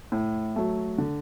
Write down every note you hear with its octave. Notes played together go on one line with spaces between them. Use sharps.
A2
F#3 A3
D3